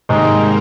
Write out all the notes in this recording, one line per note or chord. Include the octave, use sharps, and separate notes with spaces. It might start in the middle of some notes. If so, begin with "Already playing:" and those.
G#2 C3 D#3 G3 G#3 A#3